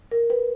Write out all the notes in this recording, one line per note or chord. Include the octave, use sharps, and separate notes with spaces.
A#4
B4